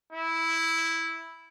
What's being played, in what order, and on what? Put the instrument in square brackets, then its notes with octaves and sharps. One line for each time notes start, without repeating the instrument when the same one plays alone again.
[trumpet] E4